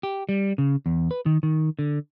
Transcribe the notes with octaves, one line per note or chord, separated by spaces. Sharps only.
G4
G3
C#3
E2
B4
D#3
D#3
D3